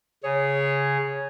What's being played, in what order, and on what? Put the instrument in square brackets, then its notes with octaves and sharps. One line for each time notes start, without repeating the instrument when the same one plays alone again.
[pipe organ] C#3 G#4 [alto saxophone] C#5